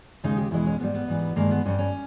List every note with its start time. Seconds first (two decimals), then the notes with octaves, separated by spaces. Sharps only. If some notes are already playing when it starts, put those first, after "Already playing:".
0.24 D#2 C#3 G#3 D#4
0.38 G4
0.51 E2 B2 G#3 E4
0.66 C#4
0.80 G#2 G3 B3
0.95 B3
1.08 G#2 E3 G3
1.36 G2 D#3 G#3 A#3
1.51 B3
1.66 G2 G3 C#4
1.79 C#4